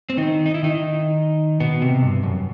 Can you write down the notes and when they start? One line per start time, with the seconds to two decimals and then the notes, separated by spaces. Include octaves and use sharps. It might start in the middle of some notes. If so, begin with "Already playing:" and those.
0.10 C4
0.17 D#3 D#4
0.46 D#4
0.54 E4
0.63 D#3 D#4
1.60 B2 B3
1.82 C3
2.03 G2
2.24 F#2